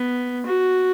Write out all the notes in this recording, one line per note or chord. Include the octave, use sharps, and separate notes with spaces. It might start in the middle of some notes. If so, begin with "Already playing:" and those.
Already playing: B3
F#4